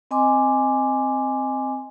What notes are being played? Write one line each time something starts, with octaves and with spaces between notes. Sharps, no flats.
C4 D#5 G#5 C6 D6